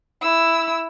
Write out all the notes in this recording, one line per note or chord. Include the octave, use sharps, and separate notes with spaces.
E4 E6